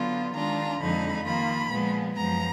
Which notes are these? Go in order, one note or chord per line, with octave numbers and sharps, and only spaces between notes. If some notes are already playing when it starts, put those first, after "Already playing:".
Already playing: D3 F#3 B3 F4
D#3 G#3 D4 F4 A#5
F2 D3 F3 G#3 D#4 B5
D#3 A#3 F4 B5
A#2 F3 G#3 B3
F#2 F3 G#3 B3 A#5